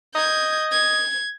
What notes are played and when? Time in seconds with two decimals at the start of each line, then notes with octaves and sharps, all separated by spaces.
0.15 D#5 G6 G#6
0.72 G#6